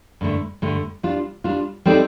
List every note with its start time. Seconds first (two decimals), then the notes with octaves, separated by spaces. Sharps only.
0.21 G2 D3 A3
0.62 G2 D3 A3
1.03 G3 D4 F4
1.44 G3 D4 F4
1.85 G3 C4 D#4 A4 D5